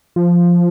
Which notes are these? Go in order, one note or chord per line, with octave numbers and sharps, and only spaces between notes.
F3